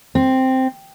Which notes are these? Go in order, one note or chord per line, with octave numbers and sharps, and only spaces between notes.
C4